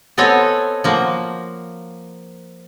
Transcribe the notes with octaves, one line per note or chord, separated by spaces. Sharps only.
B3 C4 A4 C#5 D#5 G#5
F3 A#3 F#4